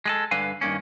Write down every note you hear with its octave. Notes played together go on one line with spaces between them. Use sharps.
G#3 G#4 A4
G2 D3 B4 F5 G#5
G2 D#3 A#3 C#4